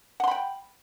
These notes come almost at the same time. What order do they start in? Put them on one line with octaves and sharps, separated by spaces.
F#5 C6 B5 G5